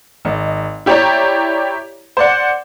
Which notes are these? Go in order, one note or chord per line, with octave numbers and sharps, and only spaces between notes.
G#1 D#5
E4 G4 C#5 D5 A#5
C5 D5 F#5